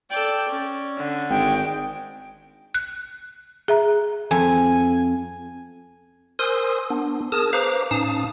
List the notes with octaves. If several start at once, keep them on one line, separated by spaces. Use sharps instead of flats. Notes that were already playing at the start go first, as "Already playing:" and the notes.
A4 D5 G5
C#4
D3
G#1 G#3 G5
F#6
G#4 E5 A#5
F2 G#5
A#4 C5 G#5 C6 D#6 E6
B3 D4
G#4 A#4 A5 D#6
B4 C5 F5 A#5 D6
A2 C#4 D#4 F5 A5 D#6